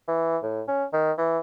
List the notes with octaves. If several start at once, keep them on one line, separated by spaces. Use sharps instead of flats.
E3
A2
C#4
D#3
E3